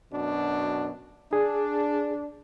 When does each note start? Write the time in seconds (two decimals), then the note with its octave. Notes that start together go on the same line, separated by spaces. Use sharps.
0.13 F#2 B2 D4
1.33 D4 G#4